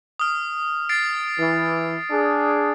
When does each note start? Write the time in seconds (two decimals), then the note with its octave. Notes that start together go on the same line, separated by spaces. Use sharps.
0.20 D#6 F6
0.89 A6 C7 D7
1.39 E3
2.10 D4 G#4